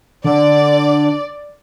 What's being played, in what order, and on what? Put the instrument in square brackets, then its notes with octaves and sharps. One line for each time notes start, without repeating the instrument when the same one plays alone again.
[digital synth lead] D3 [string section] D5